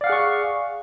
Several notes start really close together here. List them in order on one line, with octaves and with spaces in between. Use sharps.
D5 F5 F#5 G#4 C#6